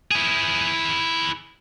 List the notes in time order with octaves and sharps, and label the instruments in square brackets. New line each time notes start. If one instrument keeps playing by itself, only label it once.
[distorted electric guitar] E4 G#4